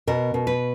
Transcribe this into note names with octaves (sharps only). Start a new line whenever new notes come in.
B2 A#4
B2
B4